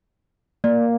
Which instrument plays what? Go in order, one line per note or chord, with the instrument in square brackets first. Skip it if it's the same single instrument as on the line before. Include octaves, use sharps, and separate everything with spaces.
[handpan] A#3 [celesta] D5